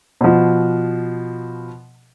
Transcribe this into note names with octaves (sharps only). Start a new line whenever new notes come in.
B2 F3